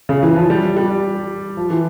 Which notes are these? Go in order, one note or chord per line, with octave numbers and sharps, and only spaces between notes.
C#3
E3
F3
G3
G3
F3
E3